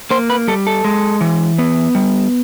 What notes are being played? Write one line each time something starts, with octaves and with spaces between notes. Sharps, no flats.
A#3 C5
B4
G3 A4
A4
G#3
E3
B3
G3